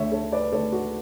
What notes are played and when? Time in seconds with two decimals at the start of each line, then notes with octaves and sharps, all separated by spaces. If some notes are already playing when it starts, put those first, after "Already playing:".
Already playing: D2 D3 C#5 E5
0.11 A4 C#5
0.32 B4 D5
0.52 D2 D3 A4 C#5
0.72 F#4 A4